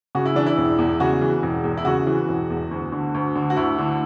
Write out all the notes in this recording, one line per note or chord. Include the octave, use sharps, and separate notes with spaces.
C#3 F#4
E4
E3 D4
E4
E1
E2
C#3 F#4
E3
E1
E2
E4
C#3 F#4
E3
E1
E2
D2
D3
D2
D3
F#4
D2 E4
D3